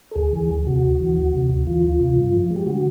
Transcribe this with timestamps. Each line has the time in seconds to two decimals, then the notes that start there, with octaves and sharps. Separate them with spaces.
0.11 A4
0.15 D2 G#4
0.33 E3
0.50 D2
0.67 C3 F#4
0.83 D2
1.00 E3
1.17 D2
1.34 C3
1.50 D2
1.67 E3 F4
1.83 D2
2.00 C3
2.17 G2
2.33 F3
2.51 G#3
2.56 G4
2.67 D3 F#4